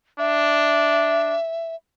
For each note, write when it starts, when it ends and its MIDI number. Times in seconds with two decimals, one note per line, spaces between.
0.19 1.36 62
0.19 1.75 76